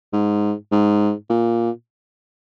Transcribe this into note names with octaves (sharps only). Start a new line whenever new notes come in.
G#2
G#2
A#2